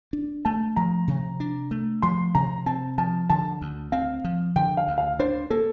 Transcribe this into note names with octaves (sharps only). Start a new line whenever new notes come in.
D4
A3 A5
F3 A#5
C3
D4
A3
F3 C6
C3 A#5
C4 A5
F3 A5
D3 A5
D2
C4 F5
F3
D3 G5
F5
D2
F5
D4 C5
A#3 A4